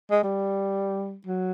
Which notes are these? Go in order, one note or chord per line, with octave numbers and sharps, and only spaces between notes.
G#3
G3
F#3